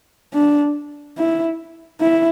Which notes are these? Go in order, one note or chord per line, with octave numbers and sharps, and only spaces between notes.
D4
E4
E4